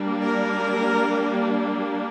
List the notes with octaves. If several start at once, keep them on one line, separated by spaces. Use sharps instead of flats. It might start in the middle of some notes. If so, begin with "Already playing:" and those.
Already playing: G3 A#3 D4
A#4